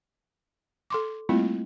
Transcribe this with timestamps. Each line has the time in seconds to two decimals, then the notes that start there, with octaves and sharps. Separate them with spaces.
0.90 A4 C6 D6
1.29 G3 A3 A#3 C4 E4 F4